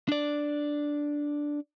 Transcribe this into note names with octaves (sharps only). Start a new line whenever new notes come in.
D4 D5